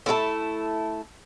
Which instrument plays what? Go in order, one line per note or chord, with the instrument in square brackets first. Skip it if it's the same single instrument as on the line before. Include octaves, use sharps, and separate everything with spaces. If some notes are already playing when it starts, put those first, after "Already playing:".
[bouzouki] A3 E4 F4 A4